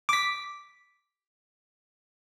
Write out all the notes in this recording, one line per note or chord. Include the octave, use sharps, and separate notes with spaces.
D6 B6